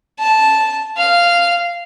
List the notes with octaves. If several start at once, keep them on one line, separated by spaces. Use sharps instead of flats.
A5
F5